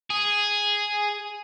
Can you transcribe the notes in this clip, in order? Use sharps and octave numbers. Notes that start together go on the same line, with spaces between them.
G#4